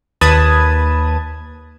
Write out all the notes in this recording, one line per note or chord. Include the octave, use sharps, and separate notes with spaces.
D#2 B4 A5 B5 D#6 G#6